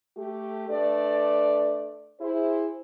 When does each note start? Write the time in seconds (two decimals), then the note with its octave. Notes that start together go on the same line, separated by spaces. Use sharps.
0.17 A3 G4
0.70 A3 D4 B4 D5
2.21 E4 G#4 C5